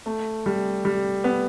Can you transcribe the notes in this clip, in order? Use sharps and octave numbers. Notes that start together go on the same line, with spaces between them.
A3
G3
G3
B3